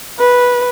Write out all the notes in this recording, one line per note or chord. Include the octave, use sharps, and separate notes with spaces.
B4